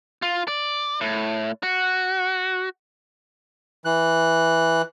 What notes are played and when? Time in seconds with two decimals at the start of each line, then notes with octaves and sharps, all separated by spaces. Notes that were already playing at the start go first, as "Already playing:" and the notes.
0.22 F4
0.48 D5
1.01 A2
1.63 F#4
3.85 E3 F#6